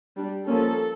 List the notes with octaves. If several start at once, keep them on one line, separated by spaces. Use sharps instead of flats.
G3 D4
F3 A#3 C#4 A4